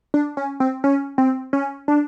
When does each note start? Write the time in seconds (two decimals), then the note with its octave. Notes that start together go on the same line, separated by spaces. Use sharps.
0.14 D4
0.37 C#4
0.60 C4
0.84 C#4
1.18 C4
1.53 C#4
1.88 D4